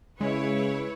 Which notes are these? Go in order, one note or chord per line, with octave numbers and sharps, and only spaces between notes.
C#3 G#3 E4 B4 C#5